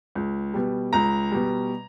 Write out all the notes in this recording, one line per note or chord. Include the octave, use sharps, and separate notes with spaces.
C#2
B2 G3
C#2 A#5
B2 G3